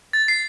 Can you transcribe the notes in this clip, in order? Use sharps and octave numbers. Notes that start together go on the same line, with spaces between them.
A6
C7